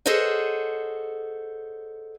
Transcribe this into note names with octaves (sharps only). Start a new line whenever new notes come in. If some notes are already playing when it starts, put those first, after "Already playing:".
G#4 A4 C5 C#5 D#5 F#5